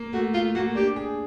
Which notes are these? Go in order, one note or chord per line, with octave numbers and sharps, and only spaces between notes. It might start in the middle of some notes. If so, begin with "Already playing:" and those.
Already playing: A#3
A3 F#4
A3 F4
A#3 F#4
D4 G4
G#4